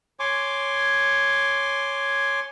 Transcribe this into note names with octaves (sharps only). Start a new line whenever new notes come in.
C#5 G#5 C6 D6